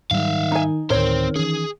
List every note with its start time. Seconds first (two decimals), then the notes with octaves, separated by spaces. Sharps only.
0.11 G#2 D#3 F#3 G3 E5 F5
0.52 D#4 G#5
0.90 D2 A2 D#3 C4 A#4 C5 C#5
1.36 E3 C#4 G#4